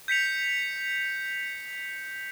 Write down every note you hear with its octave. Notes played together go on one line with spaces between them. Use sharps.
G6 B6 C#7 F7